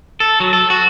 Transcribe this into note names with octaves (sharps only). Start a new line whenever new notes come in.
A4
F#3
A4
F#4